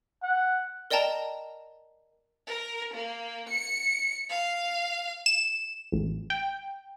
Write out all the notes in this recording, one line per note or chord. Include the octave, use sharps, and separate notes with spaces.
F#5
A#4 D5 D#5 G5 A5 A#5
A#4
A#3
C#7
F5
E7
A1
G5